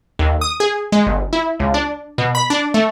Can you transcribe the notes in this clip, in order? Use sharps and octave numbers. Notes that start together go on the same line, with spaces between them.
D#2
D#6
G#4
G#3
G1
E4
C#2
D4
B2
B5
D4
A3